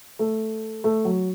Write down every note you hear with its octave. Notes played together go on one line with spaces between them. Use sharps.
A3
A3
F#3